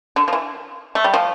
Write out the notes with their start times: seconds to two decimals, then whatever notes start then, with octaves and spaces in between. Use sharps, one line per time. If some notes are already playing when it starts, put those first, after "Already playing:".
0.16 D3
0.28 F3
0.33 E3
0.95 A3
1.04 G3
1.13 F3